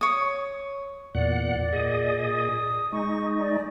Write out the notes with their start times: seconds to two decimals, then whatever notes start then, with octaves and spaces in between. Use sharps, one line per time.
0.01 C#5 D#6
1.15 E2 A#2 D5 F#5
1.73 A#2 G#4 D#5
2.25 D#6
2.92 G#3 D#4 C#6
3.40 D5